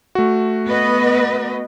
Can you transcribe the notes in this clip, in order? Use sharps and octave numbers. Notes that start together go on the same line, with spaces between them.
A3 F#4
B3 B4 D#5